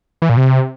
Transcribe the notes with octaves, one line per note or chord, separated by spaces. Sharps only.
E3
A#2
C3